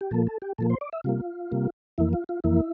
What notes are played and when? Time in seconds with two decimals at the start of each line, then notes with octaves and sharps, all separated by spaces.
0.01 G4
0.11 A#2 F3 A#3 A4
0.27 A4
0.42 G4
0.58 A#2 F3 A#3 A4
0.70 C5
0.81 D5
0.93 E5
1.04 C3 G3 A#3 F4
1.51 C3 G3 A#3
1.98 F2 E3 A#3 E4
2.13 F4
2.29 F4
2.44 F2 E3 A#3 E4